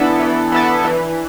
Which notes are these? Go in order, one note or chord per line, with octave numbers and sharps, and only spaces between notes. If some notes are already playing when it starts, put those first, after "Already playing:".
Already playing: E3 B3 D4 E4 A4
E3
B3 E4 A4
E3